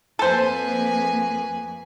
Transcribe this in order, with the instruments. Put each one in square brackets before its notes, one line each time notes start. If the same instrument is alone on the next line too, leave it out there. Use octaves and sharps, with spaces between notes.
[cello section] F2 A#3 [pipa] A4 C5 [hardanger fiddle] B4 G#5